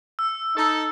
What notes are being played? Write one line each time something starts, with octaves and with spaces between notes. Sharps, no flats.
E6
D#4 A4